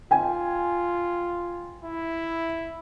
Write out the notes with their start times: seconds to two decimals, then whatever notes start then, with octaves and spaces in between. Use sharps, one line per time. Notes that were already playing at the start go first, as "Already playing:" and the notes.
0.11 F4 G5 G#5
1.84 E4